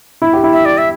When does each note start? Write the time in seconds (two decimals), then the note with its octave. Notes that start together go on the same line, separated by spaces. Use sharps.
0.22 E4
0.33 G4
0.44 E4
0.53 E5
0.65 D5
0.78 E5